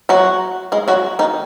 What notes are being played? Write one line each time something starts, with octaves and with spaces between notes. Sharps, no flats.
F#3 F#4
G#3 G#4
F#3 F#4
D#3 D#4